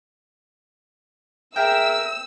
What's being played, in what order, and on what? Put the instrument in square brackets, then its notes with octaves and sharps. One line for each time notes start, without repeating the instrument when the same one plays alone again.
[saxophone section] G#4 A#4 E5 [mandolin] G5 [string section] E6